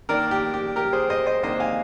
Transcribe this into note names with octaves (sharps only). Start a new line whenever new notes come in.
D#3 A#3 D4 A#4 D5
G4
G4
G4 A#4
G#4 C5
C5 D#5
C5 D#5
C3 D#3 A#3 D4 C5 D#5
F5 G#5